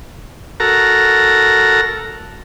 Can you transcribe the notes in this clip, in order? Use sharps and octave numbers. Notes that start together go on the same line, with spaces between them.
F#4 A4 A#4 A#5